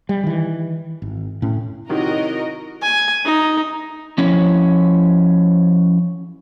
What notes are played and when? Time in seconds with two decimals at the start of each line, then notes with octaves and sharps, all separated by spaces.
0.09 G3
0.23 D#3 E3
1.02 G#1
1.42 A2 C#4
1.89 C3 D#3 F#3 D#4 E4 F#4 A#4 D#5
2.82 G#5
3.25 D#4
4.18 F3 C#4 E4 C#5